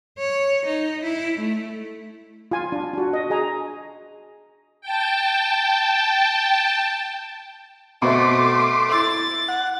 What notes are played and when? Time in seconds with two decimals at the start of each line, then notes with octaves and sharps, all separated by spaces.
0.18 C#5
0.65 D#4
1.03 E4
1.39 A3
2.51 F4 G#5
2.72 D4
2.93 D4 F#4
3.13 D#5
3.30 G#4 D#5 G#5 A#5
4.81 G5 A5
8.02 B2 A3 C4 E5 C6 D6
8.91 E4 E6 A6
9.48 F#5